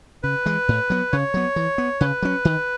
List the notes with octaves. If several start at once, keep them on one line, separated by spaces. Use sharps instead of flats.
C#3 B4
E3 G#3
A2
F#3 B3
C#3 C#5
F#3 B3
E3
B3
C#3 B4
F#3 C#4
D#3